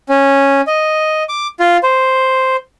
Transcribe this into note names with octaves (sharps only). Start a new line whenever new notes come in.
C#4
D#5
D6
F4
C5